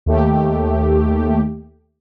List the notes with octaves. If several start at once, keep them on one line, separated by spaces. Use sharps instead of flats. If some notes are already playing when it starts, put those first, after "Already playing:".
D#2 A3 G4